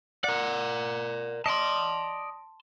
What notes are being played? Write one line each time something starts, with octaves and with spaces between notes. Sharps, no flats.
A#4 D5 F#5
D5 D#5 A5 C6